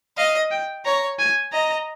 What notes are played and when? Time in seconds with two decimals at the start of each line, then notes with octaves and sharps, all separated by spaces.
0.17 D#5 F5
0.51 G5
0.85 C#5 A#5
1.19 G#5
1.52 D#5 A#5